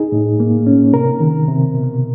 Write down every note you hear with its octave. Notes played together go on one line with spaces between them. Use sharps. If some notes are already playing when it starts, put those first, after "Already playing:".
Already playing: D#4 G#4
A2
A#3
C#4
C3 A#4
D#3
C3
B2